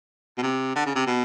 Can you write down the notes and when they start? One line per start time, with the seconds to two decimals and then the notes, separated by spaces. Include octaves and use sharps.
0.38 B2
0.43 C3
0.75 D3
0.86 C#3
0.95 C3
1.06 B2